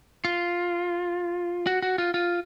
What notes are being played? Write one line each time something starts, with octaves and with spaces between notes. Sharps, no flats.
F4
F#4
F#4
F4
F4